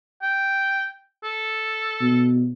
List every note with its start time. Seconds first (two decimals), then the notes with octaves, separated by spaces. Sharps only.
0.22 G5
1.24 A4
2.01 B2